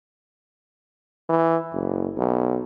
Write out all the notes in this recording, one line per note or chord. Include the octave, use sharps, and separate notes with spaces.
E3
F#1
B1